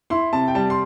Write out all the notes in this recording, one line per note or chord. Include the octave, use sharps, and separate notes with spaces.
E4 C6
C3 A5
G5
G3 A5
C6